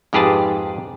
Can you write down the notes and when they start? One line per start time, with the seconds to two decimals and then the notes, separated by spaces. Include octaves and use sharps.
0.13 F2 G#2 G4 G#4 B4 A5